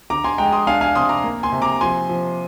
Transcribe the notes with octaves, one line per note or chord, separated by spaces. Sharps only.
D3 A#5 D6
G#5 C6
G#3 G5 A#5
C6 D#6
D4 F5 G#5
F5 G#5
C3 C6 D#6
A#5 D6
A#3
G#5 C6
C3
A#5 D6
F3 G#5 C6
F3